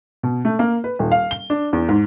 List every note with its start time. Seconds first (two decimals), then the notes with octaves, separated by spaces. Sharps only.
0.23 B2
0.45 A3
0.59 A#3
0.84 B4
0.99 D#1
1.12 F5
1.31 G7
1.50 D4
1.73 E2
1.89 G#2